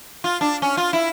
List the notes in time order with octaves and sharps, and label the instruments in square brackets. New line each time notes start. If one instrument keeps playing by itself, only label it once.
[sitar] F4
D4
C#4
F4
E4